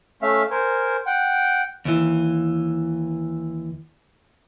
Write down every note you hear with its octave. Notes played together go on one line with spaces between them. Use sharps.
A3 C#4 E5 F5
A#4 C5 G#5
F#5 G5
D#2 E3